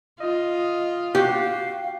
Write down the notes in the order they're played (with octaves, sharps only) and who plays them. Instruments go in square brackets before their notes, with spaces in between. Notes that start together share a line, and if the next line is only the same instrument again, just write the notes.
[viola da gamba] F4 [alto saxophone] D#5
[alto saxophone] F#4 [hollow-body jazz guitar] G4 [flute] F5